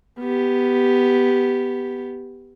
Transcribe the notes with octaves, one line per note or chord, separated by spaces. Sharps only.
B3 G4